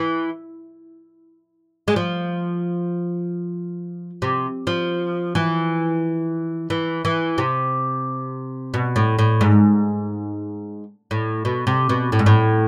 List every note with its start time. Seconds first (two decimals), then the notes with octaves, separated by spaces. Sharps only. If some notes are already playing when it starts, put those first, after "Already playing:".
Already playing: E3
1.88 G#3
1.96 F3
4.22 C3
4.67 F3
5.35 E3
6.70 E3
7.05 E3
7.38 C3
8.74 B2
8.96 A2
9.19 A2
9.41 G#2
11.11 A2
11.45 B2
11.67 C3
11.89 B2
12.12 A2
12.19 G#2
12.26 A2